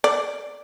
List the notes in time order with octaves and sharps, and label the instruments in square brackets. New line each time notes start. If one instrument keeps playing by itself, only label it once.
[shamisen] D5